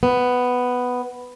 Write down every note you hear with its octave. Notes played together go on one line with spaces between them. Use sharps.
B3